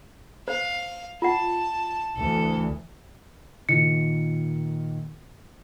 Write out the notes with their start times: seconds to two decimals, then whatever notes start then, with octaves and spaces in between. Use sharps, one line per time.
0.48 C5 F5
1.22 F4 F#5 A5
2.16 D2 E3 A4
3.69 A#2 D#3 C#7